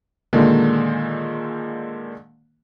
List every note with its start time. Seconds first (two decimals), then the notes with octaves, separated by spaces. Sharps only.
0.33 A#2 D3 D#3 G#3 A#3